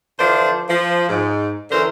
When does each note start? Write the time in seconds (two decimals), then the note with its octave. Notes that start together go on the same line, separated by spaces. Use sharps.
0.19 D3 E3 F3 D4 C5
0.69 F3
1.09 G#2
1.71 F#2 D3 E3 A#4 C5